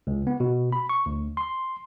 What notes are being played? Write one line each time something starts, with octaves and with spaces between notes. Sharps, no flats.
C#2
B3
B2
B5
C#6
D2
C6